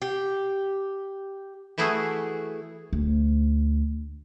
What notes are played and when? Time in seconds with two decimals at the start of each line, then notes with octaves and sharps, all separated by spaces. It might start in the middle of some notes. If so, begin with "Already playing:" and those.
0.02 G4
1.78 E3 A3 E4 F#4 G#4
2.93 D2